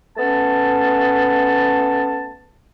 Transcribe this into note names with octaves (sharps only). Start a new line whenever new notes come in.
A3 B3 C#4 A5